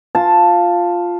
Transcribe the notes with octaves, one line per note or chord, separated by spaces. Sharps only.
F4 A5